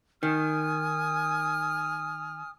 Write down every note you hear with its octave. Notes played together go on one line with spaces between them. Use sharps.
D#3 G#5 D#6 F6